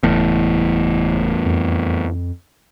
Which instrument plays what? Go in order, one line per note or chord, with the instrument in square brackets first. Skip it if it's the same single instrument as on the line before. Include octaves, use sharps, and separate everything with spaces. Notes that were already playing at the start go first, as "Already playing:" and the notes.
[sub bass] F#1 [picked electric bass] E2 A2
[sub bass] F2